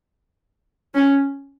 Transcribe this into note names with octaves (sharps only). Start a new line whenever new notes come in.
C#4